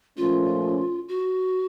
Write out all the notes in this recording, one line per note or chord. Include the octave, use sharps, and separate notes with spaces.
A#2 F3 A3 C#4 F4
F#4